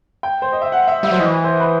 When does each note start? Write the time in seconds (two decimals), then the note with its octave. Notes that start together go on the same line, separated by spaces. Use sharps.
0.23 G5
0.42 C5
0.52 D#5
0.62 E5
0.72 F#5
0.87 E5
1.03 G3 E5
1.11 F#3 C5
1.19 E3 D#5
1.44 C5
1.60 B4